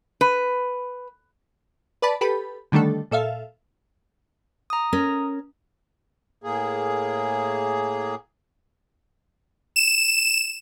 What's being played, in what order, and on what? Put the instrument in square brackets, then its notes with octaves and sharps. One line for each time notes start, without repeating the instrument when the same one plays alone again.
[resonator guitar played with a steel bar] B4
[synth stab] B4 D5 A5 B5
G4 A4 B4 B5
D3 D#3 G3 A3 D4 A4
A#2 A4 E5 F5
[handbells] A#5 D#6
[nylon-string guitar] C#4 A#4
[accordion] A2 A#3 G#4
[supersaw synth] E7